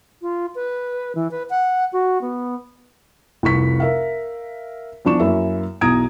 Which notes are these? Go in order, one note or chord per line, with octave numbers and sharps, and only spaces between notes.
F4
B4
E3
B4
F#5
F#4
B3
F1 C2 C#6 B6
A#4 E5 F5
E2 F3 D4 C#6 E7
F#2 A#3 E4 E5
B1 E2 A#5 D#6 G#6 D7